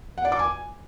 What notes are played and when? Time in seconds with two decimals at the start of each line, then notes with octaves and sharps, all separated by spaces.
0.18 F#5
0.25 D5
0.32 D6
0.39 G#5